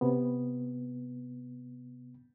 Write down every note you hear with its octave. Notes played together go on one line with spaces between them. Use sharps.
C3 B3